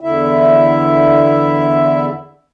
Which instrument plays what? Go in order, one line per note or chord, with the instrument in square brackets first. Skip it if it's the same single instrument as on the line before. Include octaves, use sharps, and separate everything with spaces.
[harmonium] E2 D3 E4 E5